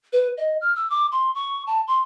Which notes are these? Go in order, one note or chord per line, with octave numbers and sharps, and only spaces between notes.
B4
D#5
F6
E6
D6
C6
C#6
A5
C6